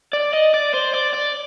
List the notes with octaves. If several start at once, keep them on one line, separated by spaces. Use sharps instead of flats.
D5
D#5
D5
C5
D5
D5